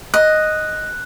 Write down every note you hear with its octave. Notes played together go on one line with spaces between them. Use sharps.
D#5 F#6